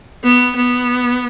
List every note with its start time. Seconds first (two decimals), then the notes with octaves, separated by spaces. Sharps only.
0.23 B3
0.56 B3